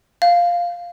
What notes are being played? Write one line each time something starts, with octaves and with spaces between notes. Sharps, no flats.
F5